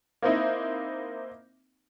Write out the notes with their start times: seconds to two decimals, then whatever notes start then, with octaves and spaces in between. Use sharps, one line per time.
0.22 A#3 C4 D#4 E4